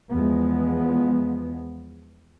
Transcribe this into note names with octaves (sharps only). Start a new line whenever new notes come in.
E2 F3 G#3 B3